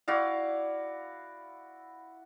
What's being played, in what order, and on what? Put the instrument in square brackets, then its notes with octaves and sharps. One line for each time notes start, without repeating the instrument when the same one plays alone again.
[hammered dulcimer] E4 F#4 D5 F5